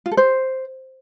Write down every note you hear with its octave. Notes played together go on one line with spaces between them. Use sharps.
F4
A4
C5